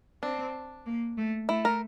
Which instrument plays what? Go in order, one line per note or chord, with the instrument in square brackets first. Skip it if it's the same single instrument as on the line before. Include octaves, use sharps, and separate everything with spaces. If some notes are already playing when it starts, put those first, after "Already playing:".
[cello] C4 [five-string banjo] D4
[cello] A#3
A3
[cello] A3 [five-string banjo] E4
[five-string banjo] A#4